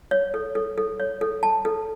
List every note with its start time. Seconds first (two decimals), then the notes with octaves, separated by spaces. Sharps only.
0.11 C#5
0.34 A4
0.55 A4
0.78 A4
1.00 C#5
1.21 A4
1.43 A5
1.65 A4